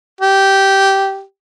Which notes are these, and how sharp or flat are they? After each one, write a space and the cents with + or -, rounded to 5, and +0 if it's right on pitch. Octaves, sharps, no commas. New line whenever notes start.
G4 -10